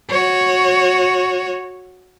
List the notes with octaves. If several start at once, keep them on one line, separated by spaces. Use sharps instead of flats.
F#4 C#5